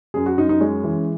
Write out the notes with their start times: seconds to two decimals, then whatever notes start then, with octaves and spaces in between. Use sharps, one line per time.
0.14 F#2 G#4
0.26 F#4
0.37 F#2 D#4
0.49 D#4
0.60 G#3 C#4
0.84 E3